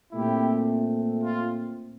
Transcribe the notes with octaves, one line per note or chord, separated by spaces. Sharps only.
A#2 A3 C4 E4 G4
F4